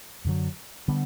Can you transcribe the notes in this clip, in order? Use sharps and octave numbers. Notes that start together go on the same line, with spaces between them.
F#2 D3 F#3
D3 G3 B3